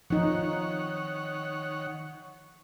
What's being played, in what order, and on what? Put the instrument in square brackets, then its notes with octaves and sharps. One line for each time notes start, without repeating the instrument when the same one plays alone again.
[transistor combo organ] D#3 C#5 F#5 [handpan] F3 D#4